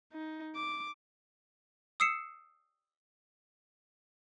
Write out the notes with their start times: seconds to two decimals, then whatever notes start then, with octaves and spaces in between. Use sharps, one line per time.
0.13 D#4
0.56 D6
2.00 D#6 E6 C7 C#7 E7